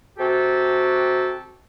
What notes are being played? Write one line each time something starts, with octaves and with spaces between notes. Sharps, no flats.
C3 F#4 G4 A4